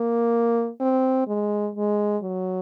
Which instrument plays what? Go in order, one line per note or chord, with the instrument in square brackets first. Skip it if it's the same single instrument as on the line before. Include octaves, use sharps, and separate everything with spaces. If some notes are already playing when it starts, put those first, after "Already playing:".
Already playing: [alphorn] A#3
C4
G#3
G#3
F#3